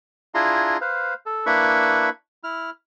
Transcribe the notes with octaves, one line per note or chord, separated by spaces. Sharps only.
D4 E4 F4 G#4 A#5 C6
B4 C5 F5
A4
A#3 D4 E4 B4 B5 C#6
E4 F6